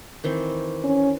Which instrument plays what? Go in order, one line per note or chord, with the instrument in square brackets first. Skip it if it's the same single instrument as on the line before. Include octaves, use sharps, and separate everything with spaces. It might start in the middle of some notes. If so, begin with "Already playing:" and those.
[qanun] D#3 E3 C4
[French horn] C#4